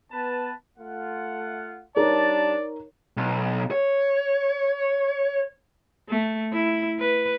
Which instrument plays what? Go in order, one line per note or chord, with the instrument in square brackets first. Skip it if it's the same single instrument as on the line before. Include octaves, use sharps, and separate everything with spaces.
[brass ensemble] B3 B4 A5
A3 F4 F#5
[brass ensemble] G3 D4 A5 [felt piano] D#4 A#4 C#5 [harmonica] D5
[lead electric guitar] B1
C#5
[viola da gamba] A3
E4
B4